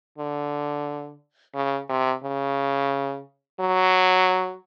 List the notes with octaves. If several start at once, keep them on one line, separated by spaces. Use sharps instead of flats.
D3
C#3
C3
C#3
F#3